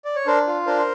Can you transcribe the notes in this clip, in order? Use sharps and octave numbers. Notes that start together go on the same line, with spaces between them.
D5
C#5
D4 A#4 C5
F4
D4 A#4 C5